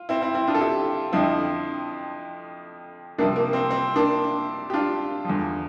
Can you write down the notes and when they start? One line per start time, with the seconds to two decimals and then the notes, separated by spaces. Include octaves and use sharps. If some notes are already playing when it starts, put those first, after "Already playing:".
Already playing: F4
0.09 C4 E4
0.22 C4 E4
0.35 C4 E4
0.47 D4 F4
0.55 A4
0.61 E4 G4
1.12 F2 D3 F3 C4 E4
3.18 C2 C3 F3 A#3 D4
3.36 A#3
3.53 C4
3.71 C4
3.96 A#3 D4
4.70 G4
4.74 D4 F4
5.25 E2 D3 F3